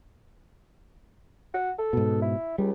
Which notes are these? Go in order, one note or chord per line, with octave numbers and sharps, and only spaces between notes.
F#4
A4
G#2 B2
E4
C#2 G3